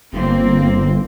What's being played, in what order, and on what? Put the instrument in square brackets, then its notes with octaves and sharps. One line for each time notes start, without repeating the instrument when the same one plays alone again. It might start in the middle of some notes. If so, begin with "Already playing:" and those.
[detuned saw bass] G1 [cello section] A#3 C4